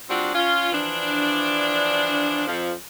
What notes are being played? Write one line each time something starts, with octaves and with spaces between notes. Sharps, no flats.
G3 C4 D4 F4 F#4
C#4 F4
E3 F3 D4
F2 F3